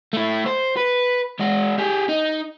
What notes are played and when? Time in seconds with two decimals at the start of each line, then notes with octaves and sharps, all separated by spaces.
0.13 A3 E4
0.46 C5
0.77 B4
1.39 G#3 F#4
1.78 G4 G#4
2.08 D#4